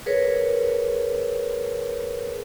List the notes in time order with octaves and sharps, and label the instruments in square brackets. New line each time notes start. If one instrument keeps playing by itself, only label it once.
[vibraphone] G#4 A#4 B4 C#5